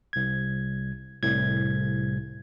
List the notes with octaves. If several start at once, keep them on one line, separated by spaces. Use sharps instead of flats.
C2 G#6
C2 A2 G#6